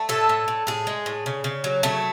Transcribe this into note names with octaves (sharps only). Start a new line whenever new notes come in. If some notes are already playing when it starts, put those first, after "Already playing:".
Already playing: A3
A2 A4
A2
A2
A2 G#4
G#3
A2
C#3
C#3
F#3
C#3 A3